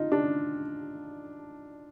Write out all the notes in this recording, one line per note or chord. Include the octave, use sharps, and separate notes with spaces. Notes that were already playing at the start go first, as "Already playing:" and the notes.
Already playing: D#4 F4
D4